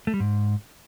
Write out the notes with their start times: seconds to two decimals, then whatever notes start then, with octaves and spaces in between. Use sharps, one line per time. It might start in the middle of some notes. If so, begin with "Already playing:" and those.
0.07 A3
0.14 G3
0.20 G#2